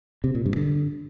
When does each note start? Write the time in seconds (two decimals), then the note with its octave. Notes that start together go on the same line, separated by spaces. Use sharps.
0.24 C3
0.35 A#2
0.46 G2
0.56 D3